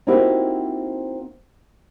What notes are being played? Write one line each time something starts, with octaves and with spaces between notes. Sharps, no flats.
A#3 C4 D#4 E4 F#4 G4